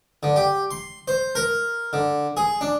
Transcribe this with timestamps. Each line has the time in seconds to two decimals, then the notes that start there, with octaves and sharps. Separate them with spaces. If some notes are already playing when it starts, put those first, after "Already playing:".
0.23 D3
0.36 G4
0.71 C6
1.08 C5
1.35 A#4
1.93 D3
2.37 G#4
2.61 D4